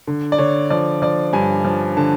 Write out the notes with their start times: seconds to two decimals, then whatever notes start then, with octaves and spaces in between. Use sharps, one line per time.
0.07 D3
0.32 D5
0.38 D3 C#5
0.70 F3 D5
1.02 F3 D5
1.33 G2 G#5
1.65 F3
1.97 D3 A5